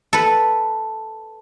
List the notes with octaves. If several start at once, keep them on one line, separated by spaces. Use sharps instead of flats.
A4 B4